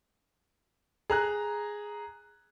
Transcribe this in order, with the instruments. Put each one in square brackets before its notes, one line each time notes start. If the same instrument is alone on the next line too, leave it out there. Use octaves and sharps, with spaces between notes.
[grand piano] G#4 A#5 F#6